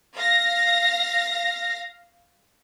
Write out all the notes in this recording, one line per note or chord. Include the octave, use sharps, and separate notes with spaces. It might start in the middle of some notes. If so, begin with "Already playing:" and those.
F5 A#6